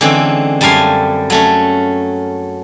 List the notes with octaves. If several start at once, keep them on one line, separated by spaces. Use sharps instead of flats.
D3 E3 G#3 C4 C#4
F#2 G3 A3 F5 G#5 C6
F#3 A3 C#4